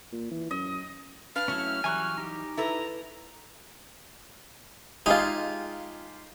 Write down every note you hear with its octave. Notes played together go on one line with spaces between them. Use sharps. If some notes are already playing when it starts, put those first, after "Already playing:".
A#2
E3
F#2 D#5
D4 B4 F5 F6
F#3 A3 C#4 E4 F#4
E3 F#3 G3 G#5 C#6 F#6
D#4 G4
E4 A4 B4 A#5
G#3 D#4 F4 G4 G#4 F5